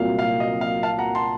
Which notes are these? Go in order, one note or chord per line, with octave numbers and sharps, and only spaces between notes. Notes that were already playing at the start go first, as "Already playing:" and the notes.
Already playing: C2 A#2 F#3 F5
F5
D#5
F5
F5 A5
F#5 A#5
A5 C6